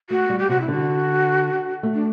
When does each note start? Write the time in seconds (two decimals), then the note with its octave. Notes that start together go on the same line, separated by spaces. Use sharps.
0.10 A3 F#4
0.30 G3
0.39 G4
0.49 C3 F#4
0.61 E4
0.68 D3 F#4
1.83 A3
1.94 D4